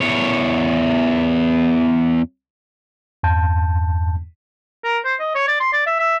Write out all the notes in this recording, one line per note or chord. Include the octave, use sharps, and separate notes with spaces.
E2 C#5
E2 G2 A5 G6
A#4
C5
D#5
C#5
D5
C6
D5
E5
E5